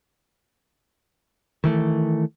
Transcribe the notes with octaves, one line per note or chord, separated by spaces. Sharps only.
D#3 E3 A3